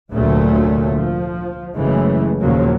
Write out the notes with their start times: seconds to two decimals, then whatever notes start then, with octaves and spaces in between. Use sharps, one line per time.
0.12 F1 D2 A#2 F#3 A3
0.95 F3
1.76 F#1 F#2 C#3 E3 G#3 A3
2.40 D#2 A#2 C#3 F3 F#3 A#3